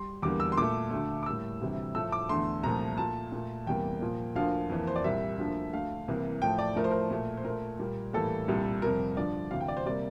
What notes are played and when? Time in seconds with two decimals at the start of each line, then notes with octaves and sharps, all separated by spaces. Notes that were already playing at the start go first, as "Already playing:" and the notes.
Already playing: G3 C6
0.22 E2 D3 G3 A#3 D6
0.40 E6
0.52 C6
0.57 A#2 A3 D6
0.91 D2 D3 A3
1.23 D6
1.26 A2 G3 A#3 E6
1.61 D2 C3 E3 G3
1.95 A2 F3 A3 E6
2.12 D6
2.29 E2 D3 A3 C6
2.63 C2 A#2 F3 A3 A#5
2.98 A#2 A3 A5
3.32 A#2 A3
3.67 E2 C3 G3 A#3 G5
4.01 A#2 F3 A#3
4.35 D2 D3 F3 A#3 F5
4.70 F2 E3 A#3
4.87 C5
4.96 D5
5.04 C2 A#2 G3 A#3 E5
5.38 D2 D3 F3 A#3
5.73 D2 D3 A3 F5
6.08 C2 C3 E3 A#3
6.42 A2 F3 A3 G5
6.59 D5
6.76 A2 F3 A3 A#4
6.84 C5
6.91 A#4
7.10 A#2 A3
7.37 C5
7.44 A#2 A3 A#4
7.79 A#2 G3 A#3
8.13 A2 E3 G3 A#3 A4
8.48 C2 A#2 G3
8.82 F2 C3 G3 A#4
9.16 G2 D3 F3 D5
9.51 D2 C3 E3 F5
9.61 G5
9.68 D5
9.77 C5
9.86 C3 G3 A#3 D5